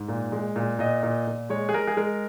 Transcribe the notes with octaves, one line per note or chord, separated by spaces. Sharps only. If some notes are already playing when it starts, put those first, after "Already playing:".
Already playing: G#2
A#2
G#3
A#2
A#2 D#5
A#2
A#2
G#3 C#5
G#4
G#3 A#4
G#4
G#3 A#4